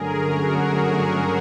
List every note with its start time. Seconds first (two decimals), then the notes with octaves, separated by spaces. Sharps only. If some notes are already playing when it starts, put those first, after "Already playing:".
Already playing: G2 D3 F#3 A3 C#4 G#4 A#4
0.28 F#4 G#4